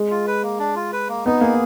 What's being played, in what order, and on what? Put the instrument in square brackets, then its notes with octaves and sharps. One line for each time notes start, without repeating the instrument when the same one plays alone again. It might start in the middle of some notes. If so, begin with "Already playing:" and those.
Already playing: [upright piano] G#3
[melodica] F4
B4
A#3
D4
F4
B4
A#3
[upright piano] B3 [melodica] D#4
[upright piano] A#3 [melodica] G#4